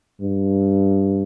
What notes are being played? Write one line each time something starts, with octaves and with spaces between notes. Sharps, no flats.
G2